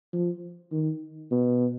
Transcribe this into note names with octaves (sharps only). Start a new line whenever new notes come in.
F3
D#3
B2